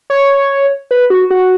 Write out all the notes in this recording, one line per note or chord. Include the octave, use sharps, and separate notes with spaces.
C#5
B4
F#4
F#4